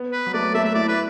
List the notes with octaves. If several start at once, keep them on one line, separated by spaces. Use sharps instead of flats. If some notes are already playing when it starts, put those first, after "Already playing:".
Already playing: B3
B4
F#3
A3 D5
A3 E5
E5
E4 D5
B4